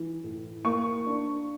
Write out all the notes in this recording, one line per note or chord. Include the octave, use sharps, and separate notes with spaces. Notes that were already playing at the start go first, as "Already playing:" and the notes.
Already playing: E3
A2
A#3 C#6
D4